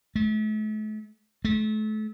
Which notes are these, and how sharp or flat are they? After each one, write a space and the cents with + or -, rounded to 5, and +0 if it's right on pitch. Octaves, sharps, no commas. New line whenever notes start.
A3 -40
A3 -35